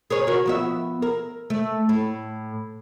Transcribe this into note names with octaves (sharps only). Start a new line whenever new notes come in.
G#4 A#4 C#5
F#4 A#4
F3 B3 E5
A#4
A3
A2